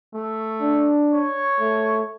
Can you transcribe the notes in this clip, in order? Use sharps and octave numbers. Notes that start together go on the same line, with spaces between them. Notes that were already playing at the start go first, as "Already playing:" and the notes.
A3
D4
C#5
A3